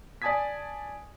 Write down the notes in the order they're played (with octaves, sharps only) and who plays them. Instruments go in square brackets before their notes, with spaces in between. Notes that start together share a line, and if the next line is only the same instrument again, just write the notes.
[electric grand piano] D5 G#5 A5 D#6 G#6 B6